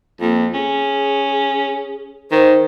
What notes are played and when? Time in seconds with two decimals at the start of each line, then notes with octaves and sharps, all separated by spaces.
0.21 F2 A#3
0.54 C#4 G#4
2.31 D#3 C5